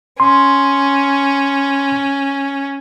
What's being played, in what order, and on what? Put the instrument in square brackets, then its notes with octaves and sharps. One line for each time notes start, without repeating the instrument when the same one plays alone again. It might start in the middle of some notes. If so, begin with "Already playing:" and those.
[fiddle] C#4 [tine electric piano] C6